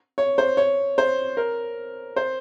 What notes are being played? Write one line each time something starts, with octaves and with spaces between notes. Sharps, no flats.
C#5
C5
C#5
C5
A#4
C5